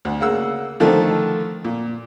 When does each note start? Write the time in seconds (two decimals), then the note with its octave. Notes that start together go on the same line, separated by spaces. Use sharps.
0.05 D2
0.20 C#3 A#3 F#5 E6
0.80 D3 D#3 F3 A3 A4
1.65 A#2